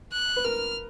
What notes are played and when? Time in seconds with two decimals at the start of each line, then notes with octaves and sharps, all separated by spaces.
0.12 F#6
0.36 B4
0.44 A#4 F6